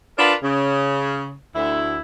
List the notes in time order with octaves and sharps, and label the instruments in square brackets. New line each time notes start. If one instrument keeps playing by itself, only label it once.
[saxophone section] D4 F4 A#4 B4
C#3
D2 E4